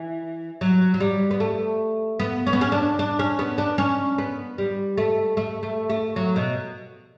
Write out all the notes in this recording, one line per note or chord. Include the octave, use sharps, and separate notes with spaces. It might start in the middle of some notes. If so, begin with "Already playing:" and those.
Already playing: E3
F#3
F#3
G3
B3
A3
B3
C#4
B3
C#4
D4
D4
C#4
B3
D4
C#4
B3
G3
A3
A3
A3
A3
F#3
B2